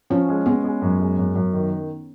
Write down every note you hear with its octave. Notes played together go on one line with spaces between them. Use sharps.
F3 C#4
G#3
G#3 B3
G#3
F#2
G#3
F#2
F#2
D#3